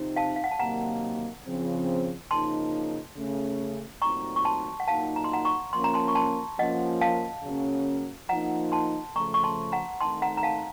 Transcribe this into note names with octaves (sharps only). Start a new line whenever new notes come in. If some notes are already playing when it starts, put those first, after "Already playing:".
Already playing: C3 F3 C4 D#4
F5 A5
F5
F#5
A5
C3 D#3 F#3 A#3 F#5 A#5
C#3 F3 C4
C#3 F3 A#3 D#4 A5 C6
C#3 A3 C#4
A#2 F#3 A3 C4 D#4 A#5 C#6
C#6
A5 C6
F#5
A#2 F#3 A#3 D#4 F5 A5
A#5
C6
F#5 A#5
A#5 C#6
F3 A#3 C#4 C6
A#5
A5 C6
C#6
A5 C6
F3 A#3 C#4 D#5 F#5
F5 A5
C#3 F#3 A#3 C#4
F3 A#3 D#4 F#5 A#5
A5 C6
C#3 F3 A3 A#5 C#6
C#6
A5 C6
F#5 A#5
D#3 A3 C4 D#4 A5 C6
F#5 A#5
A#5
F5 A5